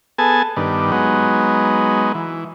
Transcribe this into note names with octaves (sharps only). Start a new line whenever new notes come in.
B3 G#4 A4 G#5 A5
G2 D#3 B3 D4
F#3 G#3 B3 D#4
E3